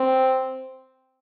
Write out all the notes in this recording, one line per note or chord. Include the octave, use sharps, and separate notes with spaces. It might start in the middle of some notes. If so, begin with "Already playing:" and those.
Already playing: C4